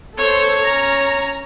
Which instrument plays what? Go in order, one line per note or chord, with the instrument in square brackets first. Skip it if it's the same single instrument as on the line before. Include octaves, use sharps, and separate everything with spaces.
[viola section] A4 C5 [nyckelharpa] C#5
[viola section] C#4 A#5